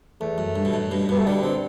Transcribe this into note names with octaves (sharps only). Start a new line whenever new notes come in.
E2 A3
F#2
G2
B2
F#2 A2
G2 B2
G2 B2 B3
A3
B2 D3 G3
D3 C4